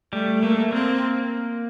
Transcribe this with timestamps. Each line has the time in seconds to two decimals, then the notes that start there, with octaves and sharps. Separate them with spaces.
0.13 G3 A3
0.42 A3 A#3
0.72 A#3 C4